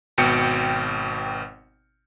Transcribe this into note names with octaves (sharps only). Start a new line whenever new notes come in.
G#1 B2 G5 C#7